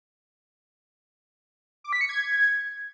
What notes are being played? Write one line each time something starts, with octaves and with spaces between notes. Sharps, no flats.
D6
B6
C#7
G#6